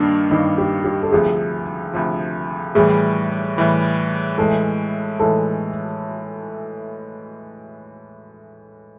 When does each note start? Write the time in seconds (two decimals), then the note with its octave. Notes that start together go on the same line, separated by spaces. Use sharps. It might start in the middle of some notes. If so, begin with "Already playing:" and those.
Already playing: G2 D#3 G3 A#3 D4
0.30 G2 D#3 G3 A#3 D#4
0.58 G4
0.84 G4
1.03 A4
1.12 D2 C3 F3 G#4
1.93 D2 C3 F3
2.75 A2 E3 G3 G#4
3.57 A2 E3 G3
4.38 A2 E3 G#3 A4
5.19 A2 E3 G#3 A4